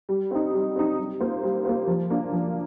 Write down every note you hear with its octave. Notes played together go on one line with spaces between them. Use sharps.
G3
C4 D#4
G3
C4 D#4
G3
A#3 F4 C5
G3
A#3 F4 C5
F3
A#3 D4 F4
F3